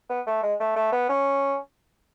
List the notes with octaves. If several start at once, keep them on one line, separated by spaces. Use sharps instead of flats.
B3
A3
G#3
A3
A3
B3
C#4